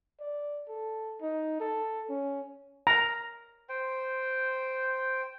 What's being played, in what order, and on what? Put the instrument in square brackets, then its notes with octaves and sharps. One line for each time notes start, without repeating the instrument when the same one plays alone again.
[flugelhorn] D5
A4
D#4
A4
C#4
[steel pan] A#5
[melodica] C5 G5